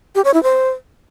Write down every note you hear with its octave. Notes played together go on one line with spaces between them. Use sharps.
G4
C#5
E4
C5